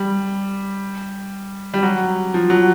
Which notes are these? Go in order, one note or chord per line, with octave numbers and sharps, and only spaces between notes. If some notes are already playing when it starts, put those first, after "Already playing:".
Already playing: G3
G3
F#3
F3
F#3